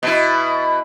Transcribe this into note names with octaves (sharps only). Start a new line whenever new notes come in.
B2 E4